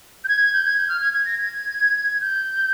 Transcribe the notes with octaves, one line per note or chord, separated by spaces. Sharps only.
G6
G#6
G#6
G6
G#6
G6
F6
G#6
G#6
A#6
G#6
G6